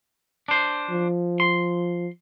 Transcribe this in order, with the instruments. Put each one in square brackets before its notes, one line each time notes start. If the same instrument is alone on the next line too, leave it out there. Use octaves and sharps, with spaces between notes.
[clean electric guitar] D4 C5
[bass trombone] F3
[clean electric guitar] C6